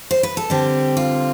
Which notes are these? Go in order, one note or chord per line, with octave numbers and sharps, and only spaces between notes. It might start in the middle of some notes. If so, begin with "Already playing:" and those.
C5
B4
A4
D3 G3 C4 G4
F4